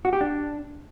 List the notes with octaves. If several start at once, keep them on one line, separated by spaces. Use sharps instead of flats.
F#4
G4
D4